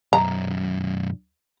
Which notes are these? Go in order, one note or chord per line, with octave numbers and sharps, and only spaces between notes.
B1 F#2 A#5